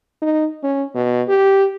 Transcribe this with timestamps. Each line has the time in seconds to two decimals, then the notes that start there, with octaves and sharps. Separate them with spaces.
0.22 D#4
0.63 C#4
0.95 B2
1.28 G4